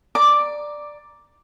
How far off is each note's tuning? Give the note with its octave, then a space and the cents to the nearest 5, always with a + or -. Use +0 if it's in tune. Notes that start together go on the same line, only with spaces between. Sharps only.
D5 +10 A#5 +10 D6 +0